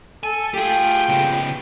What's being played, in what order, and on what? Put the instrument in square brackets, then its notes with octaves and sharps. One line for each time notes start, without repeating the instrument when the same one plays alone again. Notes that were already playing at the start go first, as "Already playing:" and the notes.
[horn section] A4 [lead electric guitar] G#5
[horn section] A3 F4 G5 [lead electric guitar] G4 G#4
[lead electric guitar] C#3 B3